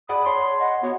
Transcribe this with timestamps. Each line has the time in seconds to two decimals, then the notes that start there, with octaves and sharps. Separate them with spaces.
0.09 G#4 D5 F#5 B5 D#6
0.25 C#5 A5 C6
0.60 D#5 F#5
0.83 B3 F#4 C#5